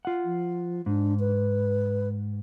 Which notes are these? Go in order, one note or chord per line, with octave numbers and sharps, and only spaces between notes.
F4 F#5
F3
G#2 D4
B4